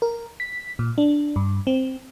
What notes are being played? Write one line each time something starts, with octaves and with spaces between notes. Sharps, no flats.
A#4
B6
A#2
D4
G2
C4